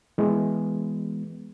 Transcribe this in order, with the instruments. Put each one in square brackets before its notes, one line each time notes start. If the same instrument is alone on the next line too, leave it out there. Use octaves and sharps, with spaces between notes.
[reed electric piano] E3 G#3 B3